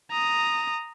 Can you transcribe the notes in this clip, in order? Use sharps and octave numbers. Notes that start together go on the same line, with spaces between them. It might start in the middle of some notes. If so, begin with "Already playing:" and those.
A#5 D#6